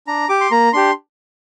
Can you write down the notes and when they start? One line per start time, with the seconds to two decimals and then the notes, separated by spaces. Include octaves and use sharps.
0.07 D4 A#5
0.29 G4 D6
0.41 C6
0.51 A#3 A#5
0.73 D4 G4 C6